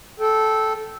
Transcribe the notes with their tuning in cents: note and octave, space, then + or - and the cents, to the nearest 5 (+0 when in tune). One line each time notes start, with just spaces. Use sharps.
A4 -10 G5 -10